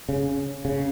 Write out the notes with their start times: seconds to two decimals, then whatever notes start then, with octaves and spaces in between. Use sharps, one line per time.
0.09 C#3
0.65 C#3